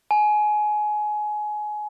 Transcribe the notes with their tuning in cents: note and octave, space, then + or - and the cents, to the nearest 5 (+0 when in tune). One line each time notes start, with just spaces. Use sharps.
G#5 +25